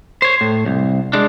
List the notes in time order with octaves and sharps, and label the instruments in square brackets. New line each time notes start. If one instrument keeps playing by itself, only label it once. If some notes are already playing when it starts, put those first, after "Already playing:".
[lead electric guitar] C5 C#5
A2
C2
G#3 D4